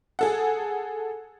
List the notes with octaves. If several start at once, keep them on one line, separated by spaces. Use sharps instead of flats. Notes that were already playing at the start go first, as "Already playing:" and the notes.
G#4 A4 F#5